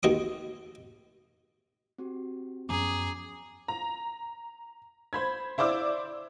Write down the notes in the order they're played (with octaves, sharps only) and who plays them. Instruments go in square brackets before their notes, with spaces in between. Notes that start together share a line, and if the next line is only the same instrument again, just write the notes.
[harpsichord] D#2 F#4 D#5 D6
[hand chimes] C4 F#4 G4
[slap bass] F#2 F3 B3 [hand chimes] C#4 A#5 D6 [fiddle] G#4
[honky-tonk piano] A#5
C5 B5 G#6
E4 C5 D5 D6 E6